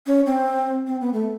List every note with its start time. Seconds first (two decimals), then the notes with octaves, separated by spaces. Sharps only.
0.07 C#4
0.26 C4
0.87 C4
1.01 B3
1.13 A3